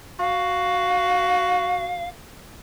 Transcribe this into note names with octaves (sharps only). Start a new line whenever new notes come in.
F#4 F5